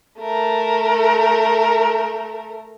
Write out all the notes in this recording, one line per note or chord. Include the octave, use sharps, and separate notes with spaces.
A3 A#4